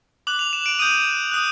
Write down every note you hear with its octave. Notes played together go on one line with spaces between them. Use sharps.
D6 F#6 F#7
F7
E7
D7
D#6 G6 D#7
D#6 F#6